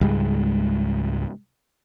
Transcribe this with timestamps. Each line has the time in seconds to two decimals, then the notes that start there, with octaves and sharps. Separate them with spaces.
0.01 C#2 G#2 G3 G#3